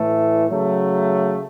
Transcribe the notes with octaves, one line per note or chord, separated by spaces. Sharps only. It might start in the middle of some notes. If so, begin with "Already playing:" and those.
Already playing: A2 E3 A3
C#3 F#3 A3